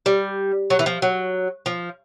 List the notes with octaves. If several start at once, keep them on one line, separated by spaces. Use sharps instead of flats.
G3
F#3
E3
F3
F#3
F3